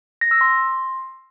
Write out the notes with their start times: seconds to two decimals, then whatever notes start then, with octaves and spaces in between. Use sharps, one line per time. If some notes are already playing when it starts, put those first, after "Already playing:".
0.21 A#6
0.31 E6
0.41 C6